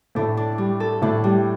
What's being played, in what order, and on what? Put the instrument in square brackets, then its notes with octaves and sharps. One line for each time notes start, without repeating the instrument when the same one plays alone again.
[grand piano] A2 A3 [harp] D4
[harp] D4
G3
A4
[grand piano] A2 A3 [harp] D4
[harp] G3